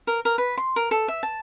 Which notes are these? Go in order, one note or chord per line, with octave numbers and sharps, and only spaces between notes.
A#4
A#4
B4
C6
A#4
A4
E5
A5